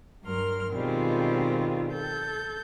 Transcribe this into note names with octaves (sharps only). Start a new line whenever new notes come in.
G2 F#3 A#4 C6 F6
B2 D#3 G3 G#3 C4 F4
A4 G6